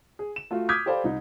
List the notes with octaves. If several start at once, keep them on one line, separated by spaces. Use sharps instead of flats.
G#4
E7
A3 F4 F#4
D6 D#6 F6 G6 G#6 B6
G4 A4 C5 D5 F5 B5
C2 D#4